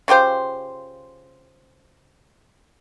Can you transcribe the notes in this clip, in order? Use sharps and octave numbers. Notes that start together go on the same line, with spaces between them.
C#3 F4 G4 C5